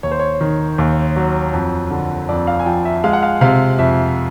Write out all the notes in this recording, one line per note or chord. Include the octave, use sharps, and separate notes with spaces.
D#2 C#5
C5
C#5
D#3
D#2
F#3
F2
D3
F2 D5
F5
G#5
F3 G5
E5
G#3 F5
F#5
F5
C3 F5
F2 E5